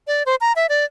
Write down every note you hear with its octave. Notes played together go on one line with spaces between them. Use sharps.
D5
C5
A#5
E5
D5